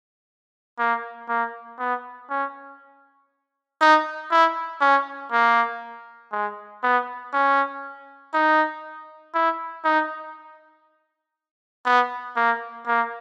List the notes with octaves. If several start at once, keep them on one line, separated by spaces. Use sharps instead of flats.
A#3
A#3
B3
C#4
D#4
E4
C#4
A#3
G#3
B3
C#4
D#4
E4
D#4
B3
A#3
A#3